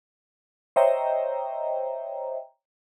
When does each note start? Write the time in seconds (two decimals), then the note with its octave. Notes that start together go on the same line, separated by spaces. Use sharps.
0.76 C5 C#5 D#5 E5 G5 A#5